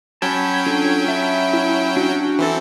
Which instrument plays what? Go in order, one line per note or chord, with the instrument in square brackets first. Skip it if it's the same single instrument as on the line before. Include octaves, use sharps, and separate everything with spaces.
[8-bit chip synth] F#3 C#4 G5 [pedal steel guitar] A5 B5 [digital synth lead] G#6
[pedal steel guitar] D4 F4 A4
E5 A5 B5
[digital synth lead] E4
[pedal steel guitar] D4 G6 [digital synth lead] F#4
[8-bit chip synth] E3 C4 A4